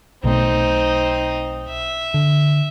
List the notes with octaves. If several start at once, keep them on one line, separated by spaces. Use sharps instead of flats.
B1 B2 A3 C4 D#4
E5
D3